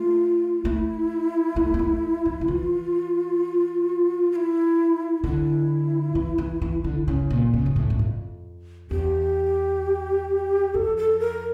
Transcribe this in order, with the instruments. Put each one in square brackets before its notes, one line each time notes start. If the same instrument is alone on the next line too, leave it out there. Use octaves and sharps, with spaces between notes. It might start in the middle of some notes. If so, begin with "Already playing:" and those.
Already playing: [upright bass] A3 [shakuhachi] F4
[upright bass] A3 [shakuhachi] E4
[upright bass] A3
A#3
A3
F3
D3
[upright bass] E3 [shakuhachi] F4
[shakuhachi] F4
E4
[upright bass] D3 [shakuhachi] E4
[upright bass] E3
E3
E3
D3
C#3
A#2
C#3
G2
A2
G2
F2
[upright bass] E2 [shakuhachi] G4
[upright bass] F2 [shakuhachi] A4
[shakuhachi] A4
A#4